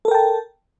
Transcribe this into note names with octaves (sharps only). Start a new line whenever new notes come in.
A4 A#4 G5 A5